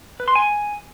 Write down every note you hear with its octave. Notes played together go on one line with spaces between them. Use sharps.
B4
C6
G#5